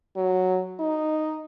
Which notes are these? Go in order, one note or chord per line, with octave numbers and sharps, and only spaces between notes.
F#3
D#4